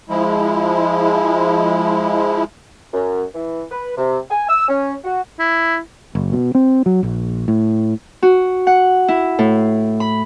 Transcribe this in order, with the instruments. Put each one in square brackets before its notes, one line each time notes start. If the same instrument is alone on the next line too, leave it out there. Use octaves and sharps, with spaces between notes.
[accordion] F3 G#3 E4
[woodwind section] F#2
E3
B4
C3
G#5
E6
C#4
F#4
[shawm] E4
[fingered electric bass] F#1
B2
C4
F#3
A#1
A2
[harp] F#4
F#5
E4
A2
B5